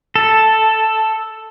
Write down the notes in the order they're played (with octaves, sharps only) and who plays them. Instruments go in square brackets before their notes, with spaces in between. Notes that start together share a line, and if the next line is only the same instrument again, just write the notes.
[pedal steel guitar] A4